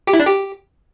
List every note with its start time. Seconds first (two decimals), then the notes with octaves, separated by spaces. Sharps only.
0.07 G4
0.13 E4
0.20 D4
0.26 G4